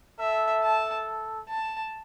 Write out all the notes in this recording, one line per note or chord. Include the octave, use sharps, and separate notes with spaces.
A4 E5
A5
A5